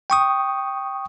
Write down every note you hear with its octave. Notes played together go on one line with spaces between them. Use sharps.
G5 C#6 D#6